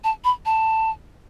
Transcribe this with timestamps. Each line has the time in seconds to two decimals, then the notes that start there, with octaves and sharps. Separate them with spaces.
0.04 A5
0.25 B5
0.46 A5